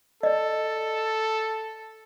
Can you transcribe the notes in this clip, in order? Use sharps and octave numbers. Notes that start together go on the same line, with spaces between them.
A4 D5 D#5